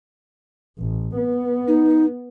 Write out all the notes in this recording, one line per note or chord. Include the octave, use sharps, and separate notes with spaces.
A1
B3
D#4